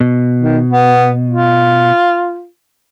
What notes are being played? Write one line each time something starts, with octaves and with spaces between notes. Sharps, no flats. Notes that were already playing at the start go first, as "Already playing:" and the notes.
B2
D#3
B3
F4